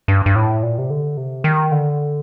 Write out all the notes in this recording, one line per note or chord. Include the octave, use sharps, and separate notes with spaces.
G2
G2
A2
A#2
C3
D3
C3
D#3
D3